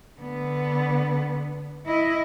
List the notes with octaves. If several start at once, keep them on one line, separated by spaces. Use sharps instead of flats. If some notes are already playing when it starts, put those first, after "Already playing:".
D3 B3
E4 D#5